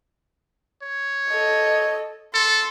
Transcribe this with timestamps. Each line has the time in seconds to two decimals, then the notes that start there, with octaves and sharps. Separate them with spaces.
0.82 C#5
1.29 A4 D#5
2.34 A4 C6